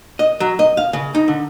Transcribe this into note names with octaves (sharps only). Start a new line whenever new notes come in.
D#5
F#3
D#5
F5
C#3
D#4
D3